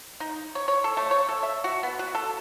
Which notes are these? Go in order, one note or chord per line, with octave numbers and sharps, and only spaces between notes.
D#4
C#5
C#5
A4
A3
C#5
A4
E5
F#4
B3
F#4
A4